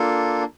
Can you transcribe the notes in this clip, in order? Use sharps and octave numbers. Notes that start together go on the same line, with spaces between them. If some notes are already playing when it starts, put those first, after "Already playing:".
Already playing: A#3 D4 F4 A4